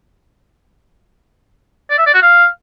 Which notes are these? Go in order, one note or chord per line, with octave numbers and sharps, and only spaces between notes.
D5
E5
D5
F#4
F5